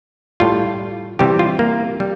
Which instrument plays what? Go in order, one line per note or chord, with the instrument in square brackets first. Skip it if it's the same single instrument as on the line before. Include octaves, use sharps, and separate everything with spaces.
[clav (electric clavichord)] A2 G3 F4
C3 E3 G3 G4
F4
A#3
G3